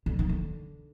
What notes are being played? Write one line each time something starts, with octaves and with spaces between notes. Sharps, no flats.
D3
D#3
D3